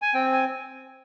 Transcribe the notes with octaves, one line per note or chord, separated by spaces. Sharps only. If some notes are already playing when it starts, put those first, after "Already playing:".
G#5
C4 G5
G#5